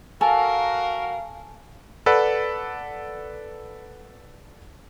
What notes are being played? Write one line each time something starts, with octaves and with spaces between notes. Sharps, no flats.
F#4 A4 A#4 F5 G#5
A4 B4 D5 F#5 B5